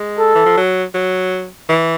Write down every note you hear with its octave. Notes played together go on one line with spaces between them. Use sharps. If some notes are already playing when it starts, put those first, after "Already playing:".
Already playing: G#3
A4
E3
F3
F#3
F#3
E3